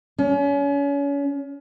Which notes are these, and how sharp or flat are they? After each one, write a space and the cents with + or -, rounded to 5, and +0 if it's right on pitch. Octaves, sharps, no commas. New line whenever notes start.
C#4 +35